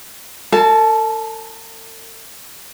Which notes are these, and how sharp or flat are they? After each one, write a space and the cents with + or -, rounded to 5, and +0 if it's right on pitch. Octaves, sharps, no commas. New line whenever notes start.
A4 +45 A5 -25